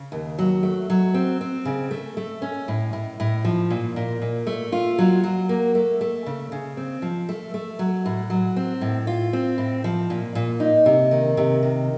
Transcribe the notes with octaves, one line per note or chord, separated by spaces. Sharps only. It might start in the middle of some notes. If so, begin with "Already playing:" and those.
Already playing: C#3
D#2
F#3
A3
F#3
C4
C4
C#3
A3
A3
C#4
A2
A2
A2
F3
A#2
A#2
A#2
A3
F4
F#3
F#3
A#3
A3
A3
C#3
C#3
C4
F3
A3
A3
F#3
A2
F#3
C4
A2
F4
C4
A2
F3
A#2
A#2
D#4
C3
D#3
C3
D#3